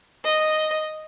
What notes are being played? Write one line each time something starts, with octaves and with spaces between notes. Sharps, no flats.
D#5